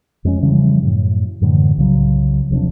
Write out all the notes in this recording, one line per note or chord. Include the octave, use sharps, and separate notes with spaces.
F2 G#3 A#3 C#4
C#3 E3 F3 G3
F#2 A2
F#2 A2 D3 E3
C2 C#3 F#3
D#1 C3 F3 D4